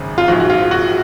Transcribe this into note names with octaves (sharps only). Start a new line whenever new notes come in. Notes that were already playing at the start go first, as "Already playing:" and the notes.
Already playing: G#1 F#2 C#3
F4
A#1 G#2 F3 F#4
F#4
F4
F#4